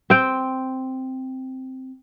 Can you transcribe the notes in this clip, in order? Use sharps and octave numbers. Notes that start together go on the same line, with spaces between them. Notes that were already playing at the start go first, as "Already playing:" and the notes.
C4 G5